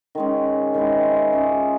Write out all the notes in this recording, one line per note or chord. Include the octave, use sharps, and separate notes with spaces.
D#3 G#3 C#4
D#3 G#3 C4 E4
G#3 C#4 F4 G#4